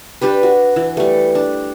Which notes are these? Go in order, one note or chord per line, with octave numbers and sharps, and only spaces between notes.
G3 D4 G4 B4
F#4
E3
G3 A3
D4